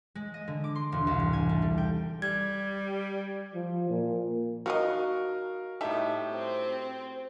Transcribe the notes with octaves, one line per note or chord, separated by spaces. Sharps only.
G#3
D#5
D3
D6
C6
E1
C2
G#2
G#5
A3
G3
G5
G3 G#6
F3
A#2
D#3 F#3 F#4 A#4 D#5 F5
A2 G3 D#4 G4 A4 E5
C4